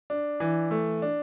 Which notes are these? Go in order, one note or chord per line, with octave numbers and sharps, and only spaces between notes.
D4
E3
A3
D4